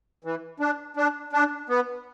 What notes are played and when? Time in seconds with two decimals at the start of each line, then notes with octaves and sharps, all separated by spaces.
0.24 E3
0.60 D4
0.97 D4
1.33 D4
1.69 B3